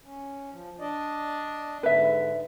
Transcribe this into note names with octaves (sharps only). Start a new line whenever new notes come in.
C#4
F3
D4 D5 D#5
G#2 D3 B4 E5